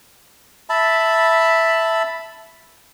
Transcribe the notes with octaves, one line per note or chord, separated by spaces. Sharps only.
E5 A5 B5